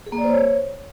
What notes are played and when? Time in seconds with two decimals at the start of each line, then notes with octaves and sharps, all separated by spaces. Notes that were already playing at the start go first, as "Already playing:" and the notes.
0.06 G#4
0.12 A#3
0.18 D5
0.24 C5
0.30 C#5